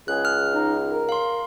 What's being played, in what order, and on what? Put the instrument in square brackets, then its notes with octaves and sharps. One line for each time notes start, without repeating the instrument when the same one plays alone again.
[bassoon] C#2 [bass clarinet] G#4 [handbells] F#6
[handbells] F6
[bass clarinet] D#4
A#4
[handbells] F5 C6